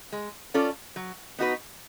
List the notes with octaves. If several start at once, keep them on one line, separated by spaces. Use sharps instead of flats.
G#3
C#4 F4 A4 D5
F#3
B3 D#4 F#4 B4